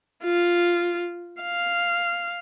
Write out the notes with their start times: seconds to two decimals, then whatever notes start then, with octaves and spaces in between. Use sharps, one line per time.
0.24 F4
1.42 F5